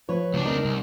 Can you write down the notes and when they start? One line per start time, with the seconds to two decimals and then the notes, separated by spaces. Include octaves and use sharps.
0.09 F3 B4 C#5
0.34 C#2 D4
0.46 C4 D#4 A#4
0.65 C2